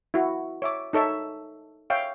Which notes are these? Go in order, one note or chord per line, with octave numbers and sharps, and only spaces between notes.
E4 F#4
C#5 E5 D6
D#4 A4 C#5 E5
C#5 E5 F5 G5